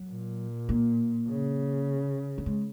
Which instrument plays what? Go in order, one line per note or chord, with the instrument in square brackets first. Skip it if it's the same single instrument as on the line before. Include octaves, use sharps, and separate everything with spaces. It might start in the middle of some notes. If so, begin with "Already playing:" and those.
Already playing: [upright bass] F#3
[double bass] A#2
[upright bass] A#3
[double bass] C#3
[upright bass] F#3
G#3